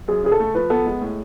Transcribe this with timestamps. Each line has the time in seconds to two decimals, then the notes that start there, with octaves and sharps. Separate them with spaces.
0.08 F#2 G#4
0.24 C#3 G#4
0.32 A4
0.40 A3
0.55 F3 B4
0.70 B3 A4
0.86 G#3
1.01 A2